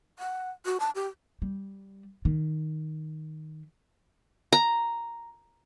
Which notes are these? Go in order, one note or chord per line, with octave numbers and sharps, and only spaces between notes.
F#5
F#4
A5
G4
G3
D#3
A#5